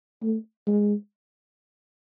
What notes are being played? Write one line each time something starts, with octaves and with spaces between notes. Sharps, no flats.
A3
G#3